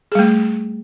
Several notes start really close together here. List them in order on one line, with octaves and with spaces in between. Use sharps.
G#4 G3 A3